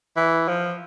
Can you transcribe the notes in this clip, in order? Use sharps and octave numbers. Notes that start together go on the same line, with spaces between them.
E3
F3